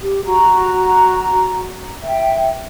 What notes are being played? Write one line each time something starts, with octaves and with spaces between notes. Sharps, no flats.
G4
F#4 A#5
E5 G5